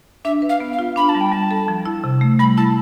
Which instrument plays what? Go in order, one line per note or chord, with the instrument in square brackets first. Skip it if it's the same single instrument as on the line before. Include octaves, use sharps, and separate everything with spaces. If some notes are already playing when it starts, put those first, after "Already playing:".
[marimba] D4 [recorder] E5
[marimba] B4
[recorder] F5
[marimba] B3
[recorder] F5
[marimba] F4
[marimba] D4 [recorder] B5
[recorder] A5
[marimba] G3
[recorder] G5
[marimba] G3 [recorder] A5
[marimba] A4
F3
E4
C3
A3
[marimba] G3 [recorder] B5
[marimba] E4 [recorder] A5